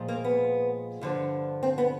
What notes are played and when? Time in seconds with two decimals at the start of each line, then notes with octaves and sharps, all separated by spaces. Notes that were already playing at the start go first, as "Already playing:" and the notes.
Already playing: A#2 F3 G#3
0.08 A#3
0.24 B3
1.01 G2 D3 F3
1.63 C4
1.78 B3